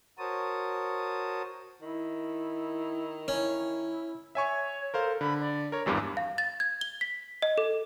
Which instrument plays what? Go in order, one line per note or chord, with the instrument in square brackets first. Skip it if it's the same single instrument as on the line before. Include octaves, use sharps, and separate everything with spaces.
[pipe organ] F#4 A#4 C5 C#5 A5 D#6
[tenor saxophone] D#3 [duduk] E4
[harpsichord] C#4 [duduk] E4
[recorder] C#5 [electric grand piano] E5 G#5 C#6
[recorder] A4 [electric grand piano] A#4 C5 F5
[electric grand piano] D3 [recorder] B5
[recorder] D5
[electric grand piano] A#4 C#5
[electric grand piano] G#1 E2 G2 [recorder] G4
[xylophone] F5
A6
G#6
G7
B6
D#5
A4